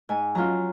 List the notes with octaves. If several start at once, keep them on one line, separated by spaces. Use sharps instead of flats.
G#2 G#5
F#3 C#4 F4 A#5